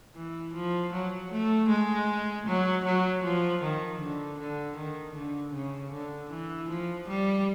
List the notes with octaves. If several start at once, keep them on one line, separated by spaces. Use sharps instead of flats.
E3
F3
F#3
A3
G#3
F#3
F#3
F3
D#3
D3
D3
D#3
D3
C#3
D3
E3
F3
G3